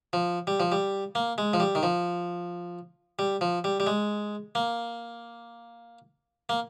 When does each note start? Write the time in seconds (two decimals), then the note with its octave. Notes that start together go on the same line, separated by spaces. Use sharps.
0.13 F3
0.47 G3
0.60 F3
0.72 G3
1.15 A#3
1.38 G#3
1.53 F3
1.60 G3
1.75 D#3
1.83 F3
3.19 G3
3.41 F3
3.64 G3
3.80 G3
3.87 G#3
4.55 A#3
6.49 A#3